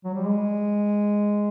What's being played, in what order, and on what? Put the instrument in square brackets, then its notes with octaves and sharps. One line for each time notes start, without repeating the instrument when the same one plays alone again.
[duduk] F#3
G3
G#3